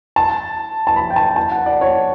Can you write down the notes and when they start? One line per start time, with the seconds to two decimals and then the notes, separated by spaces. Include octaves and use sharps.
0.16 A5
0.87 A5
0.96 B5
1.10 G5
1.16 A5
1.36 A5
1.52 F#5
1.66 D5
1.81 C#5